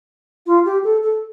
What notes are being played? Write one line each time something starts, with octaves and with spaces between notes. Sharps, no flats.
F4
G4
A4
A4